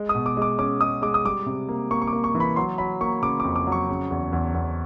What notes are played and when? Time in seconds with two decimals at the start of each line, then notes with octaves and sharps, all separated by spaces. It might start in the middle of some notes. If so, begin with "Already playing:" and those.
Already playing: G#3
0.09 D#6
0.15 B2
0.26 D6
0.37 G#3 D6
0.58 C#4 D6
0.81 G#3 D#6
1.02 G#3 D6
1.14 D#6
1.25 G3 D6
1.46 C3
1.68 A#3
1.91 A#3 C#6
2.02 C#6
2.07 D6
2.13 A#3
2.24 C#6
2.35 E3
2.40 B5
2.56 F#3 C6
2.78 F#3 B5
3.01 A#3 C#6
3.22 C#3 D6
3.40 D6
3.44 F2
3.56 D6
3.67 F#3
3.72 C#6
3.89 C#3
4.11 E2
4.32 E2
4.54 E2